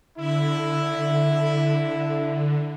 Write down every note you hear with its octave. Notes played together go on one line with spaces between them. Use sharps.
D3 E4